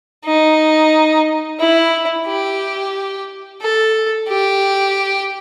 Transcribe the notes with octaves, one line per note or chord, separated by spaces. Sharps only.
D#4
E4
G4
A4
G4